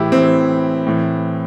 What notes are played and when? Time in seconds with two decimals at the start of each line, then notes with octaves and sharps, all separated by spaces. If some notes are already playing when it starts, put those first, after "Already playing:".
Already playing: A2 E3 E4 G4
0.12 A2 E3 C4
0.87 A2 E3